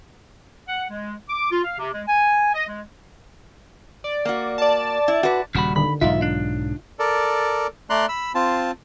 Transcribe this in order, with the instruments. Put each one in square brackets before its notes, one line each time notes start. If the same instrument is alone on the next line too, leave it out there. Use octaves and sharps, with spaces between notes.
[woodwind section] F#5
G#3
D6
F4
F5
C3
G#3
G#5
D#5
G#3
[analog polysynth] D5
[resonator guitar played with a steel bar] A#3 F#4
[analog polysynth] D5 A5
[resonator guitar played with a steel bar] E4
F#4 B4
[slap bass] D#1 G3 [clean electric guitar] C#3 F#4 B5
[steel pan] D3 D#3 [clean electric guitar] B5
[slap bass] B1 G#2 F#3 [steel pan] D#4 F4 [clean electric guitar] E5
[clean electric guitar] D4
[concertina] A4 A#4 D5
A3 D5 A#5 C6 F#6
B5 E6
C4 F4 A5